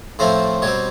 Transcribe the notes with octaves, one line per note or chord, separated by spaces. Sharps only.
A2 F3 A3 C4 C5
B2 G3 C4 C#5